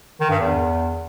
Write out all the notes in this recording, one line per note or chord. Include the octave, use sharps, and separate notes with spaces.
D#3
G2
E2